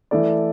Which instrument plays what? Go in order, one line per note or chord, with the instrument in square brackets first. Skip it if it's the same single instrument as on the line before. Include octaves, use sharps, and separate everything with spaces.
[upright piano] E3 A3 E4 A4 D5